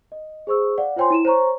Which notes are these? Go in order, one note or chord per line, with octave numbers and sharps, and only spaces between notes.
D#5
G#4 C5 C#6 E6
D5 F5 F#5
F4 C5 C#5 G5 G#5 C6
E4 D#7 E7
C5 C#5 A#5 C#6